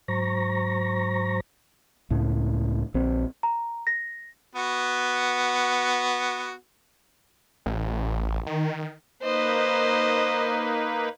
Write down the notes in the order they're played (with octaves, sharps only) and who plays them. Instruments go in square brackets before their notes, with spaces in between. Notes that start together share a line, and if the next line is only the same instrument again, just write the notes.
[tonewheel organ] G#2 F#3 C5 A#5 C#6 A#6
[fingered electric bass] C#2 A2
A#1 C4
[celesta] A#5
A#6
[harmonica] B3 F#4
[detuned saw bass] A1
D#3
[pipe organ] A#3 D#4 B4 [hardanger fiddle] C5 D#5